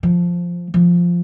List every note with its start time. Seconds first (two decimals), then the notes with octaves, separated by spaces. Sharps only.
0.03 F3
0.74 F3